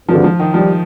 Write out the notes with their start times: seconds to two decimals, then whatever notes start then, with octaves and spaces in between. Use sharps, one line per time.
0.09 G#1 G2 D3 F3
0.24 F3
0.39 D#3
0.54 F3 G3